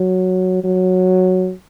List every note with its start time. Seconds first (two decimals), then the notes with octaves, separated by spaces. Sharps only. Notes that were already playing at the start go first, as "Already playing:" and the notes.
Already playing: F#3
0.64 F#3